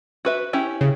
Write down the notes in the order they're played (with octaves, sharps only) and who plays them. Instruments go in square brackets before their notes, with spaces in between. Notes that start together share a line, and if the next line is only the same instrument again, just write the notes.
[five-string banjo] F#4 B4 E5
C#4 E4 G4
[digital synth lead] C#3